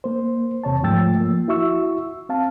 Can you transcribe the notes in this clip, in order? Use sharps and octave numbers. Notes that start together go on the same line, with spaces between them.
A#3 C5
E2 C3 C#5 A5
G#2 F3 A3 G5 E6 A6
F3 A#3
E4 F#4 E5 C#6 E6
C4 F5 A5